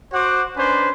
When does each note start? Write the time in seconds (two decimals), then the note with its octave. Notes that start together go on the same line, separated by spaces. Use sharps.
0.13 F#4 C5 F#5 D6
0.57 C#4 D4 B4 C5